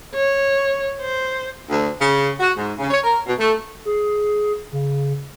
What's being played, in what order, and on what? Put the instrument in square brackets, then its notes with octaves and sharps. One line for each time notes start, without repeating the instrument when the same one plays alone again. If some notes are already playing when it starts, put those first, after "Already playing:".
[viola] C#5
C5
[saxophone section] D2
C#3
F#4
G#2
C#3
C#5
A#4
B2
A3
[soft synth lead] G#4
C#3